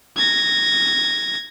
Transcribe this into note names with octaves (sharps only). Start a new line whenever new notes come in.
G#6 A#6